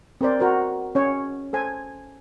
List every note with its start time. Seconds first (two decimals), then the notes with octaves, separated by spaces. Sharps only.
0.21 C4 A#4 C5 D5
0.39 F#4 A#4 C5
0.95 C#4 C#5
1.53 A4 C5 G#5